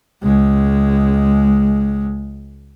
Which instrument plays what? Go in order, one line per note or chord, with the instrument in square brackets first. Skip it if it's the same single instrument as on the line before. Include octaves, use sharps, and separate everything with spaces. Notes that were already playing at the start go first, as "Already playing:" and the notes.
[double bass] C#2 G#3